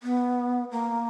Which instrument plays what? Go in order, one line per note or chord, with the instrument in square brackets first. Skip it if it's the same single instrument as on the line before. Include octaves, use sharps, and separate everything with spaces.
[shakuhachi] B3
A#3